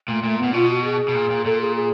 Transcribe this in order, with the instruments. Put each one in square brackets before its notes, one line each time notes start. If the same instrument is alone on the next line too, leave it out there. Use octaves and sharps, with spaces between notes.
[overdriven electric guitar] A#2 [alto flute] A3
[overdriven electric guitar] A#2 [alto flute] A3
[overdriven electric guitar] A#2 [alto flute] B3
[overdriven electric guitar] B2 [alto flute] F4
[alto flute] F#4
G#4
[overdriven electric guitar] B2
A#2
A#2
[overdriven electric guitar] A#2 [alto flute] A4
[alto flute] G#4
G#4